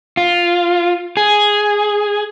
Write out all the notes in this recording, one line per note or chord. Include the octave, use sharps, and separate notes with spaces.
F4
G#4